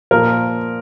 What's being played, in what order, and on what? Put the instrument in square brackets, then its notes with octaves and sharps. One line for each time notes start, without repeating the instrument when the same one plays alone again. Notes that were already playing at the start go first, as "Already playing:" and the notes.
[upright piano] A#2 F3 A#4